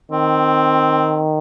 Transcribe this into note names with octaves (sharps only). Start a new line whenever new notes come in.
D#3 C4